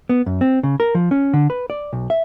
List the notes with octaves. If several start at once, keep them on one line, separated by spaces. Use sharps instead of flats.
B3
F#2
C4
C#3
A#4
F3
C#4
D3
B4
D5
B1
E5